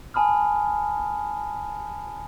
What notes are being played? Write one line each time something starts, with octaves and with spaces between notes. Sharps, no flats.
G#5 A5 B5 D#6 F6